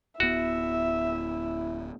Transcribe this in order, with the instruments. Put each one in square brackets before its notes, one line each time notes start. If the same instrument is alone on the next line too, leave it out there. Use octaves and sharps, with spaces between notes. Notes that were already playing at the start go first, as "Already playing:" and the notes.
[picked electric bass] D1 B3 [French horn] E4 [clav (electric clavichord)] F#4 [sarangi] E5